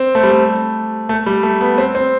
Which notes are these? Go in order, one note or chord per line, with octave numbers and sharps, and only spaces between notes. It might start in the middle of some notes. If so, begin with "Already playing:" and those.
Already playing: C4
A3
G3
A3
A3
G3
A3
B3
C4
C4